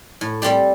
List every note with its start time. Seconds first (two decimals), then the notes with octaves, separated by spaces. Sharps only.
0.21 A2
0.42 G3 C4 G4 D5